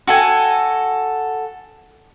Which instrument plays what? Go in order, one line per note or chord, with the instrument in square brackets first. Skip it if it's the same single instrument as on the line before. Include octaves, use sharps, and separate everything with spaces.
[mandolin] F#4 A4 G#5